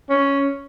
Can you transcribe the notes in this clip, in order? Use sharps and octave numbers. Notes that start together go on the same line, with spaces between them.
C#4